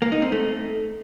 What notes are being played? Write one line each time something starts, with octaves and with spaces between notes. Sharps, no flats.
A#3
D#4
C4
A3